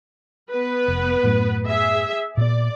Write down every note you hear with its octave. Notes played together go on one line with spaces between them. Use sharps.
B3 B4
F1
F#2 A2 F#3
G#4 E5
A#2 B3 D5